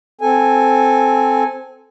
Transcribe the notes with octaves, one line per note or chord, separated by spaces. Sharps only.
C4 A4 G#5